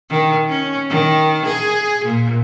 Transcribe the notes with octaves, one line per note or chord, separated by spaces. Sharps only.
D#3
C#4
D#3
G#4
A#2